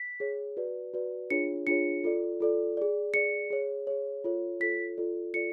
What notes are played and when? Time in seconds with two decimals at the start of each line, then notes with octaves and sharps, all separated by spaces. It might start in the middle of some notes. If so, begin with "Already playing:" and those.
Already playing: B6
0.20 G#4 C#5
0.57 F#4 B4 D5
0.94 F#4 B4 D5
1.30 D4 F4 G#4 C#5 C#7
1.67 D4 F4 G#4 C#5 C#7
2.04 F4 A4 D5
2.40 F4 A4 D5
2.77 G#4 D5
3.14 G#4 D5 C#7
3.51 G#4 C#5
3.87 G#4 C#5
4.24 F4 A4 C#5
4.60 F4 A4 C#5 B6
4.98 F4 A4 D5
5.34 F4 A4 D5 C#7